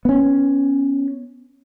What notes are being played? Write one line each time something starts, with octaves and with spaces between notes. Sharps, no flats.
B3 C#4